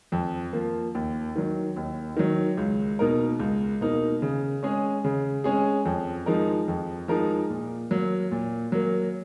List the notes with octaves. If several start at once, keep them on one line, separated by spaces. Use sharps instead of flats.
F2
F3 A#3
D#2
D#3 F#3
D#2
D#3 F#3
C#2
B2 A#3 D#4 A#4
C#2
B2 A#3 D#4 A#4
C#3
G#3 C#4 G#4
C#3
G#3 C#4 G#4
F2
F3 G#3 D#4 A#4
F2
F3 G#3 D#4 A#4
A#2
F#3 A#3
A#2
F#3 A#3